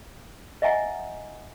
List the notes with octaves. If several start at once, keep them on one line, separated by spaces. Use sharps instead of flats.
D#5 E5 F#5 G#5 A#5